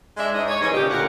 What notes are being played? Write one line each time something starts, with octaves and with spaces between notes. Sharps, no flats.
G#3 D4 E5
G#2 D4 D#5
C#5
D#2 E3 G3 C#4 G#4 D#5
A#2 C#3 G4
D2 A#2 F4 A#4 C#5 F#5